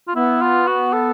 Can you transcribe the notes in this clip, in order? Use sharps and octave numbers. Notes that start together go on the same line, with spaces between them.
F4
B3 E4
F4
F#4
A4